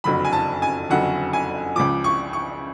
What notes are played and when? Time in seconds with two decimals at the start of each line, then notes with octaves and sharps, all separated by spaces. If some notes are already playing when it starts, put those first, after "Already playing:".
0.04 F#1 F2 D3 F#3 B5
0.25 G#5
0.33 A5
0.62 G#5
0.89 F#1 F2 D3 F#3 F#5
1.33 G#5
1.76 C#2 C#3 F3 D6
2.04 C#6
2.33 C#6